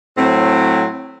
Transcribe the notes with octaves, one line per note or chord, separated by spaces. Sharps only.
A2 F#3 C4